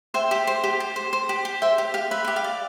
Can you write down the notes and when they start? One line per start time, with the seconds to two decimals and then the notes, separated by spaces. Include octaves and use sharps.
0.14 C5 E5 G5
0.31 G4
0.47 C5
0.64 G4
0.80 G4
0.96 C5
1.13 C5
1.29 G4
1.45 G4
1.62 C5 E5 G5
1.78 G4
1.94 G4 F5
2.11 B4 E5
2.24 G4 E5
2.36 F5
2.44 D5